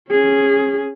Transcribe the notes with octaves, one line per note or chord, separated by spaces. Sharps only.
C#4 G#4